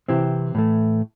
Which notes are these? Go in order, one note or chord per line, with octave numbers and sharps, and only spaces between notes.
C3 E3 C4 E4 G4
A2 E3 A3